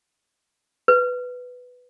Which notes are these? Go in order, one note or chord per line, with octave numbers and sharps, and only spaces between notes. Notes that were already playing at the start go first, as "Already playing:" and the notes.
B4